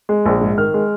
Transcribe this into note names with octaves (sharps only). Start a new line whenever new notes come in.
G#3
A#1
G#2
D#3 F6
G#3